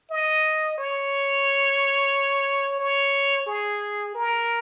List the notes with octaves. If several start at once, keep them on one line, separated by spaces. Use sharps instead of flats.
D#5
C#5
C#5
G#4
A#4